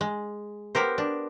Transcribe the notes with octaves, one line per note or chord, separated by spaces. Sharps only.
G#3
B3 G4 A#4 C5
D4